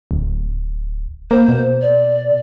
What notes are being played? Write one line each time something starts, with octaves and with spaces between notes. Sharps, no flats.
D1
A#3 C5
B2
D5